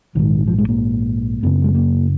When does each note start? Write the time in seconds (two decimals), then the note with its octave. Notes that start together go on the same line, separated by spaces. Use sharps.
0.15 A#1 G#2 D#3
0.47 F3
0.58 G#3
0.68 A#3
1.43 F#1 F#2 C#3 B3
1.64 G#3
1.75 A#3